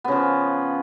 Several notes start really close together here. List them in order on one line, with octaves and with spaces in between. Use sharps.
B3 C#3 F3